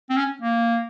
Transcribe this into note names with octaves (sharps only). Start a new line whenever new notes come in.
C4
C#4
A#3